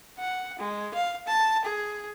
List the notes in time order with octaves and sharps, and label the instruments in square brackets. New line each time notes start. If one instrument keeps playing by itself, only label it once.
[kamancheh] F#5
G#3
F5
A5
G#4